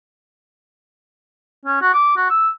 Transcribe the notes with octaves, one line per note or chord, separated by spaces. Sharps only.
C#4
F#4
D6
F#4
E6